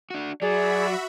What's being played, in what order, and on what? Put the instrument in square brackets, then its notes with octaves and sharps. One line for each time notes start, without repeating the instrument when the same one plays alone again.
[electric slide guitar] D4 F#4
[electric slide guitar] F#3 [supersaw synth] F#4 E5 B5 [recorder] G#4 [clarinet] D5